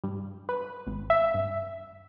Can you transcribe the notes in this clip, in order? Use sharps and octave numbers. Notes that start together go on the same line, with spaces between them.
G2
B4
G#1
E5
G2